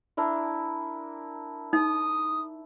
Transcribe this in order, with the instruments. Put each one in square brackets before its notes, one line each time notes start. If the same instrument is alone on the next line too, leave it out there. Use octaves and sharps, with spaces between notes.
[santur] D4 E4 A#4
[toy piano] D#4 [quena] D#6